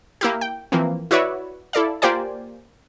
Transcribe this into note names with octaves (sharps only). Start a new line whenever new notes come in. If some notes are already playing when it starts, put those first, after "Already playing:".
A#3 E4 G4
G5
E3 F3 A#3 C4
E4 F#4 B4 C#5 D5 E5
E4 A4 D5 F5
A#3 F4 G4 C5 D5 G#5